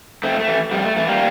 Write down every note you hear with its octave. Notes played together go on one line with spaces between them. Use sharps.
F2 A3 C4
A3
E3
F2 G3
A3
E3 A3
G3 A#3